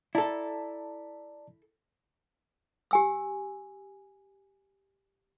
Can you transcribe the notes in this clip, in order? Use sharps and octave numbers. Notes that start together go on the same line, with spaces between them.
E4 A4 D5 A5 A#5
G4 G#5 E6